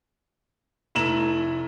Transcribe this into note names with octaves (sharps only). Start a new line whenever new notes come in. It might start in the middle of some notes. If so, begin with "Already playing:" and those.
F1 A3 E4 A#5 E7 F#7